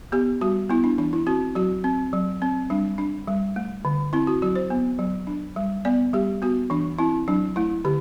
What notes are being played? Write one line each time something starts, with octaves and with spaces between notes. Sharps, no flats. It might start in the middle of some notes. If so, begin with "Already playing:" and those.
B3 G4
G3 F#4
B3 E4
D4
E3 D4
E4
C4 F#4
F#3 F#4
C4
F#3
C4
G3 D4
D4
G3
A3
D3
C4 E4
F#4
F#3 F#4
C5
B3
F#3
D4
G3
B3 D5
G3 G4
B3 F#4
E3 D4
C4 E4
F#3 D4
A3 E4
D3 G4